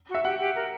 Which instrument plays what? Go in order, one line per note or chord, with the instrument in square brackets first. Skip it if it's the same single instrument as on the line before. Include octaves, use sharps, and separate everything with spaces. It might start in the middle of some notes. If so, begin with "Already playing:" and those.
[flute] F#4
[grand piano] E5
[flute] G4 [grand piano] F#5
[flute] G4
A#4